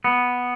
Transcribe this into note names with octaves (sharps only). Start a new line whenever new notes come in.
B3